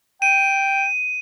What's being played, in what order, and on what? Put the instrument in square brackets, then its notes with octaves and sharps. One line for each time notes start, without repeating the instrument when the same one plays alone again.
[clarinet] G5 [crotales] D#7